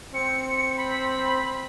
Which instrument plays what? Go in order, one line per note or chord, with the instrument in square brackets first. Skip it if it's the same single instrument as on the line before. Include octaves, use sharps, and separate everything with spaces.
[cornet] C4 [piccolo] C#7
[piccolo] B5